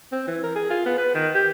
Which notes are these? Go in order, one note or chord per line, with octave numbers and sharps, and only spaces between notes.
C4
E3
A#4
G#4
F4
B3
B4
D#3
G4